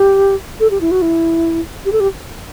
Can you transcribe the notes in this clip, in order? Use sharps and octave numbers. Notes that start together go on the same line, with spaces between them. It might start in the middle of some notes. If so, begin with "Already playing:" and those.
Already playing: G4
A4
G4
E4
F#4
E4
G4
A4
G4